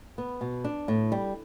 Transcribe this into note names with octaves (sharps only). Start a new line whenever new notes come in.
B3
B2
D4
A2
G3